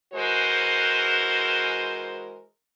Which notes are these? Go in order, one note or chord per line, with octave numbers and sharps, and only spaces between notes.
E3 G#3 F#4 A#4 C5